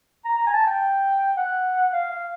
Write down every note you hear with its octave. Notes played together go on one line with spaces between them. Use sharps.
A#5
A#5
G#5
A5
G5
F#5
F5
F5